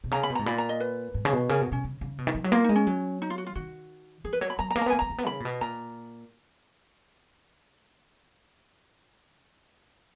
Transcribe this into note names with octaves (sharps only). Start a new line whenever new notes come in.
B2
C#3 A#5
B5
B2
G#2 A#5
A#2 B5
A#5
D#5
B4
G#2
C#3
B2
C#3 A#4
B2
B2 C#4
C#3
C#3
B2
D#3
F3
F#3
A#3 F4
G#3 D#4
C#4
F#3
D#4
F4
F#4
F4
D#3 F#4
F3 G#4
B4
F#3 C#5
B5
F#3 A#5
A#5
A#3
A#5
B3
A#3 G#5
B3 A#5
A#3
B3
C#3 B5
A#2
B2
A#2 A#5